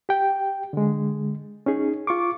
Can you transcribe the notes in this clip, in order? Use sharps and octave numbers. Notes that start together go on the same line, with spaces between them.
G4 G5
D3 G#3
C#4 D#4 G#4
F4 C#6 D6